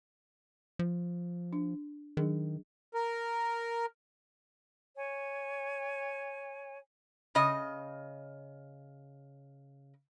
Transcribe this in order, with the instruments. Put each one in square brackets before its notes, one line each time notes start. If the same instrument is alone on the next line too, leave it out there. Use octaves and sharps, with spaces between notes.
[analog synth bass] F3
[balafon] D4
[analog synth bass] D#3 [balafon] F#3 D4 G#4
[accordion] A#4
[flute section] C#5 G#5
[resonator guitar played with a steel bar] C#3 D#5